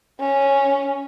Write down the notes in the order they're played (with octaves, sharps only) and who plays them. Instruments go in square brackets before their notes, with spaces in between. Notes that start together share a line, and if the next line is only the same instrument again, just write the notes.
[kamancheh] C#4